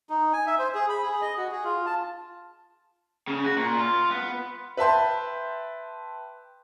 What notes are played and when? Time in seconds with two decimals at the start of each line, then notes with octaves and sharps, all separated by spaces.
0.10 D#4
0.33 G#5
0.47 E5
0.59 C5
0.75 G#4
0.89 B5
1.03 G#4
1.21 D#5
1.37 F#4
1.51 G#4
1.64 F4
1.86 A5
3.28 C#3
3.45 F#4
3.57 A#2
3.79 F4
4.11 B3
4.77 B4 E5 G5 A5 C6 G6